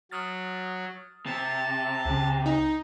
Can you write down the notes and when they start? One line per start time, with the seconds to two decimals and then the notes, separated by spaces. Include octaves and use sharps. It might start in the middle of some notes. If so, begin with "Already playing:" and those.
0.11 F#3 D#6 F6 A6
1.26 C3 A5
2.05 C#2 C#3
2.46 D#4